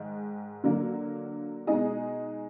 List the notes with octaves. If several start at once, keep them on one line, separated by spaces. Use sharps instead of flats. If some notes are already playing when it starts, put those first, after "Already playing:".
Already playing: G#2 D#3
D3 F#3 A#3
B2 G#3 D#4 G#4 D#5